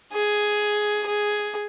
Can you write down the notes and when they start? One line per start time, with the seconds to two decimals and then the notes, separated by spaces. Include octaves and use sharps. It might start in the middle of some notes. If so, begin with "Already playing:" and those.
0.13 G#4
1.07 G#4